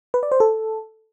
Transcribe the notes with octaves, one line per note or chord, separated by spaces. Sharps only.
B4
D5
C5
A4